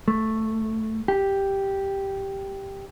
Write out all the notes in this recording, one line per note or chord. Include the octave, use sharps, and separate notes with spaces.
A3
G4